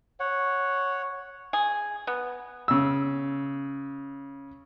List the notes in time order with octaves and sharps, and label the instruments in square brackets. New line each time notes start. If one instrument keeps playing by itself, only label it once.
[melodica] C#5 F#5
[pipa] G#4
B3
[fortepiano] C#3 E6